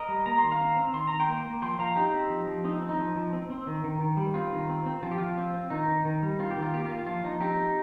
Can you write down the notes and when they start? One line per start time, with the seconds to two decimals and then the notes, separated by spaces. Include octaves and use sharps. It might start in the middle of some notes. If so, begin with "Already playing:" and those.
Already playing: A#4 D#5
0.08 G3
0.26 A#3 A#5
0.38 C6
0.44 D#3
0.51 F5 A#5
0.61 C4
0.77 C4
0.94 D#3 C6
1.07 D#3 A#5
1.20 G5 C6
1.28 A#3
1.46 A#3
1.62 F3 G5 C6
1.79 F3 F5 A#5
1.96 C4 D#4 G4
2.14 C4
2.30 F3
2.47 F3
2.64 C4 D#4
2.82 C4
2.89 D#4
2.98 F3
3.16 F3
3.33 C4
3.50 C4
3.67 D#3
3.84 D#3
4.00 D#3
4.17 G3
4.34 C4 F4
4.52 D#3
4.69 C4
4.86 C4
5.03 F3 F4
5.11 G4
5.18 F3 F4
5.37 C4
5.54 C4
5.70 D#3 D#4
5.88 D#3
6.05 D#3
6.23 G3
6.39 C4 F4
6.51 G4
6.57 D#3
6.62 F4
6.74 A#3 G4
6.85 A#3 F4
7.07 F3 F4
7.24 F3 D#4
7.41 C4 D#4 G4
7.58 C4